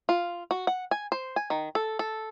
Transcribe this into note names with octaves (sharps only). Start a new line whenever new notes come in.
F4
F#4
F#5
G#5
C5
G#5
D#3
A4
A4